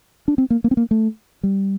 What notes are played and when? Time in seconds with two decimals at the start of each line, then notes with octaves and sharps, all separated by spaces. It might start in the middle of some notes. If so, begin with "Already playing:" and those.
0.28 D4
0.38 C4
0.50 A#3
0.64 A#3
0.71 C4
0.77 A#3
0.91 A3
1.43 G3